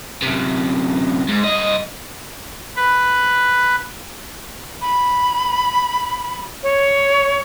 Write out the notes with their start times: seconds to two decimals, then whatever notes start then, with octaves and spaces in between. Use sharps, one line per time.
0.23 F#2 C3
1.29 G#2
1.44 G2 D#5
2.76 B4
4.81 B5
6.63 C#5